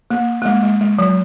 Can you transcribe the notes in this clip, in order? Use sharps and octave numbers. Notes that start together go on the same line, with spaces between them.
A#3
A#3
G#3
G#3
G#3
F#3